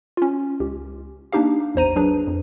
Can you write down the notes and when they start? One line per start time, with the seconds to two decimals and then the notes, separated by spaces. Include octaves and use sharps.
0.17 C#4 F4
0.60 C#2 G4
1.32 A#3 D4 D#4 G4 F5
1.75 A1 E2 C5 A#5 D#7
1.96 F#3 D4 G#4 B4
2.27 F2